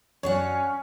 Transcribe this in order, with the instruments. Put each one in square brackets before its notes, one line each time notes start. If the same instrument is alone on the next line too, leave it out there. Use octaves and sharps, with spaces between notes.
[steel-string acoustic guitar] F#2 D4 F#5 [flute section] C#4 [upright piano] C#5